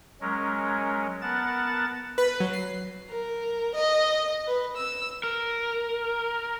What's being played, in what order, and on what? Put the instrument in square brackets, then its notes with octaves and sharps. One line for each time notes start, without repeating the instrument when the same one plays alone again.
[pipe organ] F#3 G#3 C#4 A#4
B3 A#4 F#5 A5 A6
[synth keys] B4
F#3
C7
[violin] A#4
D#5
B4
E6
[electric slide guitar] A#4